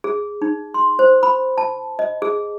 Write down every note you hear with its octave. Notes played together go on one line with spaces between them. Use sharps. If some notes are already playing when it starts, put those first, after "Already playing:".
G#4
D#4
C6
C5
B5
A5
D#5
G#4